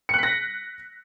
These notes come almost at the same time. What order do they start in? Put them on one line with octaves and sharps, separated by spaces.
C#7 F#6 B6 A#6